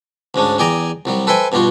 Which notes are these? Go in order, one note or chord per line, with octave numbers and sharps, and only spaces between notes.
D2 G#2 C#4 D4
E2 G#4 D5 G5 G#5 A#5
C2 F#3 G3
A4 B4 C5 E5 G5 G#5
G2 B2 G3 F4 F#4